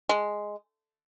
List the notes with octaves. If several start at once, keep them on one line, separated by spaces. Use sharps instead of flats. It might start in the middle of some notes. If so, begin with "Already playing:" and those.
G#3